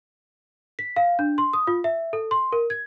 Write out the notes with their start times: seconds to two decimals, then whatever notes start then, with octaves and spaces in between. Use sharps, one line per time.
0.79 B6
0.96 F5
1.19 D4
1.38 C6
1.53 D#6
1.67 F4
1.84 E5
2.13 A4
2.31 C6
2.52 A#4
2.70 G#6